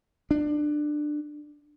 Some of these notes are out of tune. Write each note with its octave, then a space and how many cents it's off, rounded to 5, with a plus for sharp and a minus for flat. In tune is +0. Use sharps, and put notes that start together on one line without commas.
D4 +20